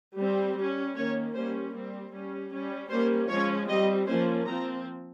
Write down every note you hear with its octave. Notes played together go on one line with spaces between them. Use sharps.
G3 C4
G3 C#4
D#3 A#3 C#4 C#5
G3 A#3 C#4 C5
G3 C4
G3 C#4
G3 C#4
G3 A#3 C#4 C5
F3 G#3 C#4 C#5
G3 C4 D#5
F3 A#3 C#4 C5
F3 C4 A#5